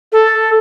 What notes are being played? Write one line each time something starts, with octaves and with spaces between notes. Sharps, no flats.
A4